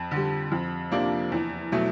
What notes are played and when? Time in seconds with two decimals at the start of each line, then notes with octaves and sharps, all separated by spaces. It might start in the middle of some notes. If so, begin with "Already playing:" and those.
Already playing: F2
0.11 D3 G3
0.51 F2
0.92 C3 F3 A#3 D4
1.32 E2
1.72 B2 F#3 A3